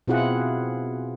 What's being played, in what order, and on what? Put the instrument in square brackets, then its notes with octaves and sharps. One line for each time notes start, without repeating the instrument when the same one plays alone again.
[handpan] B2 C4 E4 F4 G#4 F#5